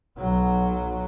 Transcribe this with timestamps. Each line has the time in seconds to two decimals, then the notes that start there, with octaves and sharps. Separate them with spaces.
0.17 B1 F#3